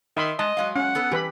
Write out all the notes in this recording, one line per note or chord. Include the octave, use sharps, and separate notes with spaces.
D#3 E5 B5 C6
G#3 D#5 A5
F#3 G#3 F5
C#4 F#5
B3 A4 B4
E3 G4 B4 B5